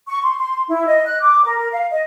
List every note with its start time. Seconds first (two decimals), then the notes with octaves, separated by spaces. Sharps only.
0.08 C#6
0.23 C6
0.39 C6
0.68 E4
0.87 D#5
1.06 F#6
1.21 D6
1.44 A#4
1.57 A#4
1.72 F5
1.91 D#5